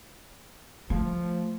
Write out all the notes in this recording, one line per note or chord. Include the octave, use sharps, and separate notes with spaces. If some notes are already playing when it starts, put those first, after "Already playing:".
F3 A3